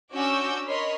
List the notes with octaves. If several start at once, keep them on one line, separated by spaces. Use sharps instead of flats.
C#4 D4 F#4 D6 E6 G6
A#4 C#5 D#5 B5 C6